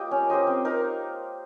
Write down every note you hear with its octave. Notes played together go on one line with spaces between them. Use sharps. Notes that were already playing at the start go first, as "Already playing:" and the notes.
Already playing: A#3 F4 G4 A#4 D#5
C#4
G4 C5 D#5
C4
D#4 A#4